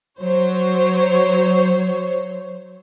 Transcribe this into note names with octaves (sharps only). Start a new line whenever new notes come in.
F#3 C5 C#5